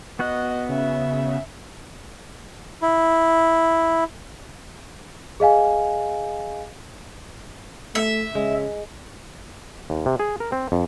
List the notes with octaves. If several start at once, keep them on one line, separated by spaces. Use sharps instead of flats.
B3 F#4 D#5 F#6
C#3 E5
E4
G#4 D#5 F5 G#5
A3 E5
C#3 G#3
D#2
C3
G#4
A#4
C4
F2